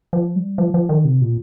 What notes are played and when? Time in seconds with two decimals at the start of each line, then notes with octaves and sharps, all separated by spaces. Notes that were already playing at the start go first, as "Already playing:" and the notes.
0.13 F3
0.36 G3
0.58 F3
0.74 F3
0.89 D#3
1.05 C3
1.21 A#2